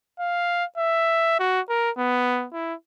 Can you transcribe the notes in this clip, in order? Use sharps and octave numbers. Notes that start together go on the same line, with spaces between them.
F5
E5
F#4
A#4
B3
E4